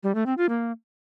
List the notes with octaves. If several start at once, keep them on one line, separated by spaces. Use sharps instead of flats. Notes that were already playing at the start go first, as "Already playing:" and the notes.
G3
A3
C4
F4
A#3